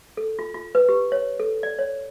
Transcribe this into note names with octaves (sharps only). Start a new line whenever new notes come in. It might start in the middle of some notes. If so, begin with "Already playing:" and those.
A4
F4
F4
B4
G4
C#5
A4
D5
C#5